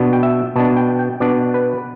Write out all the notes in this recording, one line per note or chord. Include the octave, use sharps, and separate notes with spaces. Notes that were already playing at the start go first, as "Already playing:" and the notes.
Already playing: B2 B3 D4
G5
E5
B2 B3 D4 A5
G5
G5
B2 B3 D4 D5
B4